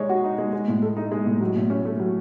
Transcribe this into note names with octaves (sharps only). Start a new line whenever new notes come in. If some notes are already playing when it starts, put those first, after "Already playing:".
Already playing: G#3 D#4 C#5
F#4
D#4
G#3
G#3
A2
A4
D#4
G#3
A2
F#3
A2
C#4
A3
F#3